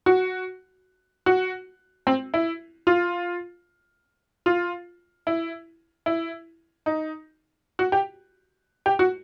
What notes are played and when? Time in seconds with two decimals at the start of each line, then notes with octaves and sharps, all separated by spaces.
0.06 F#4
1.26 F#4
2.07 C4
2.34 E4
2.87 F4
4.46 F4
5.27 E4
6.06 E4
6.86 D#4
7.79 F#4
7.92 G4
8.86 G4
8.99 F#4